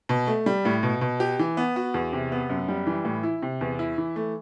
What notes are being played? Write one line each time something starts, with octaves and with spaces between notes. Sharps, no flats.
B2
A3
G3
A2
B2
B2
G4
E3
B3
F#4
E2
C3
B3
F#2
G3
E3
A2
E4
C3
E2
E4
E3
A3